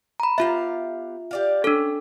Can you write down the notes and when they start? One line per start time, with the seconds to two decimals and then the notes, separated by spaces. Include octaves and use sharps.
0.20 A#5 B5
0.38 B3 F4 G4 E5 F5
1.31 G4 D5 F5
1.64 C#4 D4 A4